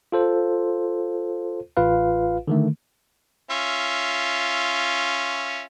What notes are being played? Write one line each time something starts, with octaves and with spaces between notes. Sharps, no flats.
F4 A4 C5
A1 F4 B4 F5
D3 D#3 A3
C#4 F4 E5